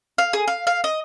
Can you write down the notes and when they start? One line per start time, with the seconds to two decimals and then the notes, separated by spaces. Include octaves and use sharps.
0.18 F5
0.33 G#4
0.48 F5
0.67 F5
0.84 D#5